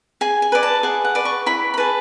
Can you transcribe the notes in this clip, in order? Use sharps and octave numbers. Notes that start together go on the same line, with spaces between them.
G#4 G#5
G#5
B4 D5
A5
G#4 F#5
F#5
B4 D5
C#6
E4 B5
B5
G#4 B4 A5